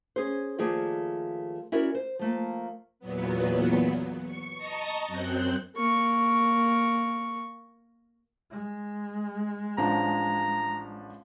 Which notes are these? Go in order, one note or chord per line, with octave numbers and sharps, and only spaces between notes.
C#4 G#4 C5
D#2 F3 A3 G#4 D5
C#4 E4 F#4 A#4 D5
C5
F3 A3 A#3
E2 A#2 F#3 B3
C#6 C#7
D#5 A5 A#5 C#6 D#6
F#2 F#3 C4 F#6 G6
A#3 C#6
G#3
A1 F3 D4 A#5